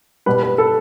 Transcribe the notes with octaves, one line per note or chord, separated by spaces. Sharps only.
B2 G3 B4
B4
A4